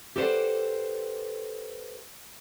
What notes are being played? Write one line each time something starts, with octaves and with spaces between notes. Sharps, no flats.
G4 A4 B4 C5 D5 F#5